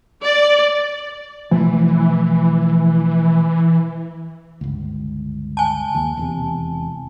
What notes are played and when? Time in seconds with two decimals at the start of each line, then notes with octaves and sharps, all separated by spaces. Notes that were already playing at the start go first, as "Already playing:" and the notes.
0.24 D5
1.51 B2 E3 F3 A3
4.61 G1 C#2
5.57 G#5 A5
5.95 D#2
6.17 E1 E2 C3